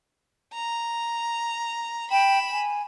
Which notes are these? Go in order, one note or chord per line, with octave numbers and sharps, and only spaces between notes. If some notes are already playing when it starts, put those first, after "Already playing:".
A#5
G5 B5 E7
G#5